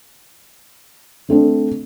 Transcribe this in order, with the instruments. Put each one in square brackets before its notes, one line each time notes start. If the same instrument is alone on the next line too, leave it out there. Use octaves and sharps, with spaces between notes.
[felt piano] D3 A3 C4 D4